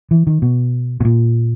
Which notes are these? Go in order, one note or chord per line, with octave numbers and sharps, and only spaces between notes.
E3
D#3
B2
B2
A#2